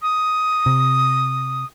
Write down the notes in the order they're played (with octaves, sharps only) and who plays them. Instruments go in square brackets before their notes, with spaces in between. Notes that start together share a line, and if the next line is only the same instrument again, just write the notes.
[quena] D#6
[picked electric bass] C3